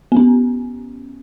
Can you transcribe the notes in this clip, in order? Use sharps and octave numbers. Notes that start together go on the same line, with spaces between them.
B3
C#4